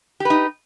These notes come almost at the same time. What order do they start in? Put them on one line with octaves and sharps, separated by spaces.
G4 B4 D#4